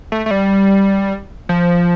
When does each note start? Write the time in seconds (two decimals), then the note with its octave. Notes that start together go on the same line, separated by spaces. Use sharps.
0.12 A3
0.26 A3
0.31 G3
1.49 F3